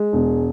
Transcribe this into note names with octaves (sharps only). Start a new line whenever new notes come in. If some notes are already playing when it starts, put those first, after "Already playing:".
Already playing: G#3
E1